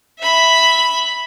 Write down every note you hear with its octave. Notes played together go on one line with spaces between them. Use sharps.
E5 B5